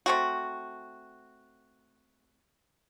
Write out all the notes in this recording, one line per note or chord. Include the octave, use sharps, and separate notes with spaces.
A3 C4 F#4